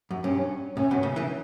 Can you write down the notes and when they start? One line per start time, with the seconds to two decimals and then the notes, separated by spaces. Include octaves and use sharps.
0.11 F#2
0.24 G2 C#4
0.76 A2 C#4
0.91 G2 B2
1.03 A2 C#3
1.16 C#3 E3